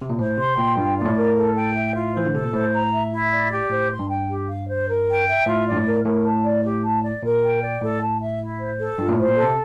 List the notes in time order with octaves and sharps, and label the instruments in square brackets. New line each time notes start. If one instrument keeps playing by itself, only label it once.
[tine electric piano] C3
A#2
[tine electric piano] A2 [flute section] C5
[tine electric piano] C3 [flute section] C6
[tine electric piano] A#2 [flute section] G5
[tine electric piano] G2 [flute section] F4
[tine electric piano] A#2 [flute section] D5
[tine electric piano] A2
[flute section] A#4
A4
G5
E5
F4
[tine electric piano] E3 [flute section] C5
[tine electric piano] D3
[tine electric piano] C3 [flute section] A4
[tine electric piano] A#2
[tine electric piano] A2 [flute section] C5
[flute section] A#5
E5
E4
D5
G4
[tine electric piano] A2 [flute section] C5
[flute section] C6
[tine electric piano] G2
[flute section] G5
G4
F5
C5
A#4
G5
E5
[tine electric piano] A2 [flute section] F4
[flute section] D5
[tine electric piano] G2
A2
[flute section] A#4
[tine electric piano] A2 [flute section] A#4
[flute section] A5
D5
G4
A5
D5
[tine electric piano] A#2 [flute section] A#4
[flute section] G5
D5
[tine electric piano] A2 [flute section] A4
[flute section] A5
E5
E4
C5
A4
[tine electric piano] G2 [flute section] F4
[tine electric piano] A#2
A2
[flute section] C5
[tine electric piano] A#2
[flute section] A4
[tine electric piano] C3